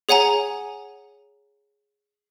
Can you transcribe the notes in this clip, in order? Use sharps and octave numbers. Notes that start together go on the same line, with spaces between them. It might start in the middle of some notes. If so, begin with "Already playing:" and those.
G#4 C#5 F#5 G#5 A#5